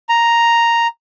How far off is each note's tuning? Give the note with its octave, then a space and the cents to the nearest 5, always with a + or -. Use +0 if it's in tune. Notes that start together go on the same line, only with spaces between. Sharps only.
A#5 +0